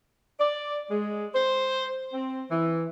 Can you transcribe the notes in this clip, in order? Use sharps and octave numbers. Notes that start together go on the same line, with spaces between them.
D5
G#3
C5
C4
E3